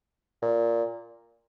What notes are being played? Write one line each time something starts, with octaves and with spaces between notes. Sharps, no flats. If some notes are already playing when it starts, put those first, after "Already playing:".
A#2